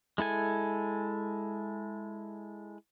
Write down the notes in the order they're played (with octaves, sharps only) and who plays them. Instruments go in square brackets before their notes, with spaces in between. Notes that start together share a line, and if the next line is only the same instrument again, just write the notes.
[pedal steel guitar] G#3 E4 A4 G#5